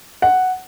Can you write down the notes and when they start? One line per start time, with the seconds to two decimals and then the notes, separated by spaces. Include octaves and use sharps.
0.22 F#5